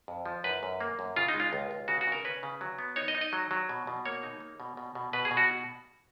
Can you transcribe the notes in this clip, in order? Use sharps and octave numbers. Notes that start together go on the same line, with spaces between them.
F2
F3
F#2 B4
F#2
A#3
F#2
C#3 F4
D#4
G#3
F4
C#2
C#2
C#3 F#4
F#4
C#3
A#4
C#4 B4
C#3
F#3
B3
D#4 C#5
D#5
D#4
D#5
F#3
F#3
B2
B2
A#3 C#5
D#4
A#3
B2
B2
B2
B2 B4
G#4
B2
F#4